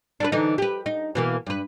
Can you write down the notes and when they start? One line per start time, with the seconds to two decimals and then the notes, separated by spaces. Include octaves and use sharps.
0.20 D4 A4 B4
0.32 D3 E3 D#4
0.58 G4 B4
0.86 D#4
1.15 B2 E3 A#3
1.46 G2 B4